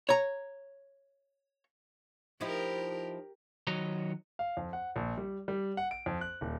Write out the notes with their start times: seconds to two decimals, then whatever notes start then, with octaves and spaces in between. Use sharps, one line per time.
0.09 C#5 A#5
2.41 F3 D#4 E4 G4 A#4
3.67 D#3 F#3 F#4 C#5 D#5 A#5
4.39 F5
4.57 F2
4.73 F#5
4.96 A#1
5.18 G3
5.48 G3
5.77 F#5
5.91 D7
6.06 F2
6.21 F#6
6.41 D#1